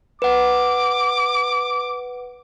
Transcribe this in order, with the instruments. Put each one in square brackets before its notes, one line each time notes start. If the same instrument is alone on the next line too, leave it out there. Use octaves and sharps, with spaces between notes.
[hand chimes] B4 F#5 [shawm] D6